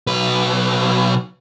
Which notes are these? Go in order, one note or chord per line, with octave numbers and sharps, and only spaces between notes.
B1 B4